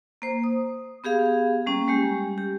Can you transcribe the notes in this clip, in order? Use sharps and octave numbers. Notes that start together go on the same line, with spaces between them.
A#3 C5
D#6
B3 G4 G#4 F5
G3 A#3 C#4
G3 G#3 G4
G4